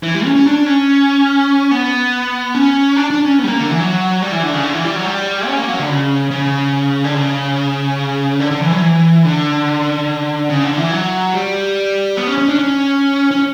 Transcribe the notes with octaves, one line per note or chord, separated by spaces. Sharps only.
E3
G3
C#4
C#4
D4
C#4
B3
C#4
D4
D4
C#4
B3
G3
A#3
D3
E3
F#3
G3
E3
D3
C#3
D3
E3
G3
F#3
G3
C#4
A#3
F#3
D3
C#3
C#3
D3
C#3
D3
D3
E3
F#3
E3
D3
C#3
D3
E3
F#3
G3
B3
C#4
C#4
D4
C#4
C#4